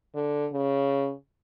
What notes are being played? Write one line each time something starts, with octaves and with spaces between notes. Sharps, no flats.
D3
C#3